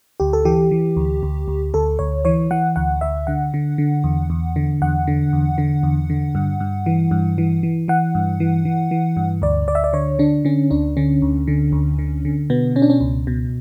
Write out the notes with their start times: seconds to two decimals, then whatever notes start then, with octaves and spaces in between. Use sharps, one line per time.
0.20 D2 G4
0.33 A4
0.45 E3 G4
0.71 E3
0.96 D2
1.23 D2
1.48 D2
1.74 D2 A4
1.99 D2 C#5
2.25 E3 C#5
2.51 E3 F#5
2.76 D2 F#5
3.01 D2 E5
3.27 D3 F#5
3.54 D3
3.78 D3
4.04 E2
4.30 E2
4.56 D3
4.82 E2 F#5
5.07 D3
5.33 E2
5.58 D3
5.83 E2
6.10 D3
6.35 G2
6.60 G2
6.86 E3
7.11 G2
7.38 E3
7.63 E3
7.88 E3 F#5
8.15 G2
8.40 E3
8.65 E3
8.91 E3
9.17 G2
9.42 D2 D5
9.67 D2 D5
9.75 E5
9.84 D5
9.93 D3 C#5
10.19 D3 D4
10.45 D3 C#4
10.71 D2 D4
10.97 D3 C#4
11.22 D2
11.48 D3
11.72 D2
11.99 D3
12.25 D3
12.50 B2 B3
12.76 B2 C#4
12.82 D4
12.90 C#4
13.01 C#2
13.27 B2